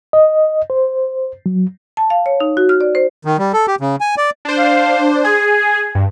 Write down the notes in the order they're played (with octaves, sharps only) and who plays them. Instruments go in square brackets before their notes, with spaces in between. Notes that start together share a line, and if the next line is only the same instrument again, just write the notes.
[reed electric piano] D#5
C5
F#3
[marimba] A5
F5
C#5
D#4
F#4
F6
D5
C5
[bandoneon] D#3
G3
A4
G4
C#3
G#5
D5
[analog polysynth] D4 C5
[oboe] F5
[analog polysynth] G#4 [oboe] G#5
[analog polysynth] G2